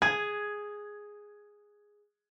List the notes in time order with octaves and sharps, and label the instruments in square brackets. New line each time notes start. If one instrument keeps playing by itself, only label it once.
[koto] G#4 [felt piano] G#6